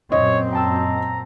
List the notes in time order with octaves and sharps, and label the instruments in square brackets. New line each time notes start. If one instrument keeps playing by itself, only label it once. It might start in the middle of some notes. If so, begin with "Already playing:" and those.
[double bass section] F#2 A#2 C4 [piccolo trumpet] C#5 [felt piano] D#5
[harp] G5 A5 E6 [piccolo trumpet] A#5